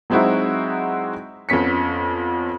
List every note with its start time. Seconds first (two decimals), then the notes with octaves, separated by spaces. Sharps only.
0.10 F#3 G#3 C4 D#4 E4 F#4
1.49 F2 B3 C#4 B6 C#7